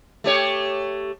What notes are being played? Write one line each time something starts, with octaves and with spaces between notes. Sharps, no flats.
A3 G4 C#5